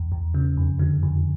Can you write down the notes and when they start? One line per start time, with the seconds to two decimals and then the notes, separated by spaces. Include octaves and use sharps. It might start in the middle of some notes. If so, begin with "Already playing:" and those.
Already playing: E2
0.12 E2
0.34 C#3
0.57 F2
0.79 D3
1.03 F2